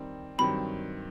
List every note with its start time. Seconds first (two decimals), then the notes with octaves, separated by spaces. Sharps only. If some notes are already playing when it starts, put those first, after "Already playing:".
Already playing: D#3 G3 C4
0.38 G2 D#3 F#3 C4 B5